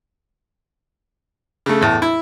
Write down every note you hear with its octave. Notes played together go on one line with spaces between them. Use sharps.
C#3 A3
E2 A2
E4